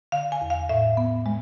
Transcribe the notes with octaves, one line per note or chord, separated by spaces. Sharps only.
D3 F5
G#5
E2
F5
A2 E5
B3
G#3